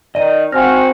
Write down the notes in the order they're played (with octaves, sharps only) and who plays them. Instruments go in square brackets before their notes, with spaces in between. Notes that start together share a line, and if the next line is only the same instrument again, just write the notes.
[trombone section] D#3 [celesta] D5 D#7 [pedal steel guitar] D#5
[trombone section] G#1 F#4 [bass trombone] C4 [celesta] F5 G#5 A#6 [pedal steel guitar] F6